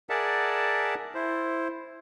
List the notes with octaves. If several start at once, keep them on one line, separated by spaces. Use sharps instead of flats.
G#4 A#4 D5 E5 F#5 A5
E4 C5